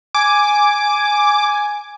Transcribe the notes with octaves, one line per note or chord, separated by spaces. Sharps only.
G#5 D6